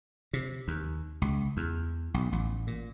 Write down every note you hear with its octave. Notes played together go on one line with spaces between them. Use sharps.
C3
D#2
C#2
E2
B1
A1
A#2